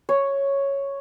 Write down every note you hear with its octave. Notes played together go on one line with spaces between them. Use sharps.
C#5